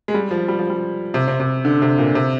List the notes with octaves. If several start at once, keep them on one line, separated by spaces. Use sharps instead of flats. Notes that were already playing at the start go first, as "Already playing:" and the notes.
G#3
G3
F3
G3
F3
G3
C3
C3
C3
D3
C3
A#2
C3